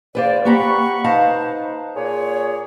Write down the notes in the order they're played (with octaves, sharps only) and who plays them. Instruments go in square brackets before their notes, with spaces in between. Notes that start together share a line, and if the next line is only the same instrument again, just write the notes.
[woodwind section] E2 D5 [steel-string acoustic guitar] B4 C5 F5
[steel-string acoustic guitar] A#3 G4 A#5 [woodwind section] F#5 B5 C#6
[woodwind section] D#4 B4 C5 [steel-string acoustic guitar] F5 A5 A#5
[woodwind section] A#2 G#4 C#5